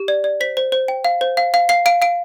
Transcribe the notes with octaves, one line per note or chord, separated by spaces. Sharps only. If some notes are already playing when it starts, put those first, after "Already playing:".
Already playing: G4
D5
D5
C5 B6
C5
C5
G5
F5
C5
F5
F5
F5 C7
F5 D7
F5 D7